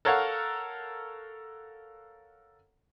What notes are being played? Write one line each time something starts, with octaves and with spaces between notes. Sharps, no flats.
A4 A#4 C#5 F5 F#5